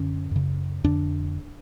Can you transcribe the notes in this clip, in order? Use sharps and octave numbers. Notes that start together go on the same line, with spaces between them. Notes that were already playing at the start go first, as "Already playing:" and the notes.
Already playing: F#2 D3 C#4
F#2 C#3
F2 D3 D4